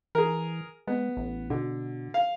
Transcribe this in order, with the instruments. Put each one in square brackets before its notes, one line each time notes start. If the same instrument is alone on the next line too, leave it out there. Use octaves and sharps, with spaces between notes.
[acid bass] E3 [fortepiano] G#4 A#4
[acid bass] G#3 [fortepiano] B3
[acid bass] A1
[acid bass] B2 [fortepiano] D3
[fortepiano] F5